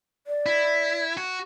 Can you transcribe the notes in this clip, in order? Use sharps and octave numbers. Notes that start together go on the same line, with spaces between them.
D5
E4
F#4